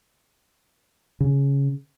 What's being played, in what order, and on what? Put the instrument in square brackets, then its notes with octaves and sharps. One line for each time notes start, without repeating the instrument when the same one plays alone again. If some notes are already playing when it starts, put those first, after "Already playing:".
[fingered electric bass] C#3